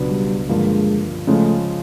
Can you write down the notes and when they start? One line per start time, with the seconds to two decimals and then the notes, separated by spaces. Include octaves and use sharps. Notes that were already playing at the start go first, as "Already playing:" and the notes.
Already playing: C#2 B2 F#3 B3 D4
0.10 G3
0.49 G2 D3 F3 G#3 A#3
1.27 C#3 F3 G#3 A3